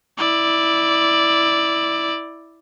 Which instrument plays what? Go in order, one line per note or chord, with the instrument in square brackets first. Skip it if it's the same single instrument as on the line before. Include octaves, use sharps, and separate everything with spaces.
[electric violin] E4 D5